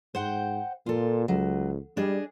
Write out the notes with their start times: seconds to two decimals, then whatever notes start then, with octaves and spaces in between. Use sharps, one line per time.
0.15 G#2 C5 F#5 G5
0.86 A#2 F4 A4
1.28 C#2 F#3
1.97 G3 D4 G#4 D#5